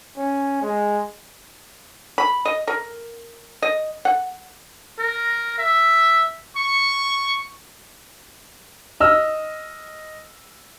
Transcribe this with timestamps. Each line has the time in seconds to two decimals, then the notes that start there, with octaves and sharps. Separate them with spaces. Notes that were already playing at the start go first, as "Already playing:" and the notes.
0.18 C#4
0.62 G#3
2.18 B5
2.45 D#5
2.67 A#4
3.62 D#5
4.05 F#5
4.99 A#4
5.58 E5
6.57 C#6
9.00 D#5 E6 F6